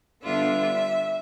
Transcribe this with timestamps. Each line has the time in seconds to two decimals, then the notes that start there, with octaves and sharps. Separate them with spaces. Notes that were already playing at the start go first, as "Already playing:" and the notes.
0.22 D3 G3 B3 D4 F4 E5